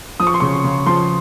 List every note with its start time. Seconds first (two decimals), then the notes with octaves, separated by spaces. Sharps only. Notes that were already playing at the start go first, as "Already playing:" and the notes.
0.20 F3 D#6
0.27 C#6
0.34 C6
0.40 C#3 C#6
0.64 C#3
0.86 F3 C6